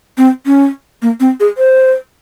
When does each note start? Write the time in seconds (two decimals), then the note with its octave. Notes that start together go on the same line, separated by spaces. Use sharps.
0.17 C4
0.46 C#4
1.02 A#3
1.20 C4
1.40 G#4
1.57 C5